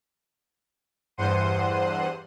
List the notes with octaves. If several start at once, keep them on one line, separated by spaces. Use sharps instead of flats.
E2 G2 C5 F#5 C6 D#7